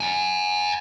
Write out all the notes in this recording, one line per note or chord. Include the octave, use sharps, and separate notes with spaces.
F#5 G#5